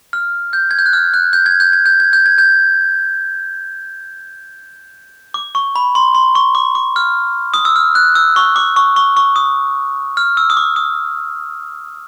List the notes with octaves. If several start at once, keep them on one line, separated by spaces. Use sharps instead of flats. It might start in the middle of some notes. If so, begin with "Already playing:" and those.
F6
G6
G#6
G6
F#6
F6
F#6
G6
G#6
G6
G#6
G6
G#6
G6
G#6
G6
D6
C#6
B5
C6
C6
C#6
D6
D6
F6
D#6
E6
F6
F#6
E6
C#6
D6
C#6
C#6
C#6
D#6
F6
E6
D#6
D6
D#6